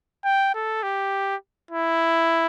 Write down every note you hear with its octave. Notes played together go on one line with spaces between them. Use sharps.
G5
A4
G4
E4